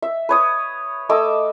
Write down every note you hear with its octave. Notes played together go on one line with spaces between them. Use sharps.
E5
B4 C#5 D#6
A3 D#5 D6 E6